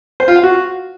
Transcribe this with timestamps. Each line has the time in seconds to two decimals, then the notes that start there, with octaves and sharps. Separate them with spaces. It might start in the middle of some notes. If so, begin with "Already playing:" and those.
0.20 C5
0.28 F4
0.36 F5
0.44 F#4